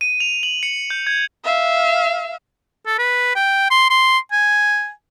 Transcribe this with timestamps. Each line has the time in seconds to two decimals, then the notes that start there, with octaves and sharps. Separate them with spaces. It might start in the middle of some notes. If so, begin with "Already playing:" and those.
0.01 D#7
0.20 F7
0.43 F#7
0.63 C#7
0.90 G6
1.07 G#6
1.45 E5 F5
2.86 A4
2.98 B4
3.36 G5
3.70 C6
3.90 C6
4.32 G#5